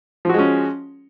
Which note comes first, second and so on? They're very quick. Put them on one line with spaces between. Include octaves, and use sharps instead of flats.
F3 F#4 G#3 C#4